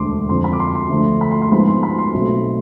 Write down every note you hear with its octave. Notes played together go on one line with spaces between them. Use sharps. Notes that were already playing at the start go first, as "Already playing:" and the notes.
Already playing: E1 D2 D3 C6 D6
F2 D3 F3 C6
B5
D6
C6
C6
D2 D3 F3 A3
B5
C6
C6
G#2 F3 G#3 B3 B5
C6
B5
C6
B1 B2 A3 C4